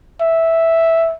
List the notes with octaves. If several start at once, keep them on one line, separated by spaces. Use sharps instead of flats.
E5